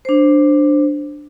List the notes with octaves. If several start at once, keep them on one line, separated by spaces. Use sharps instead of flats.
D4 C5